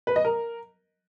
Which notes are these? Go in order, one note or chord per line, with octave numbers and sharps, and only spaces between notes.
B4
D#5
A#4